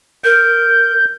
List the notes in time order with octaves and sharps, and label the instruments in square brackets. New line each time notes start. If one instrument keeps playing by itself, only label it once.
[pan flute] A#4 [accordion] G6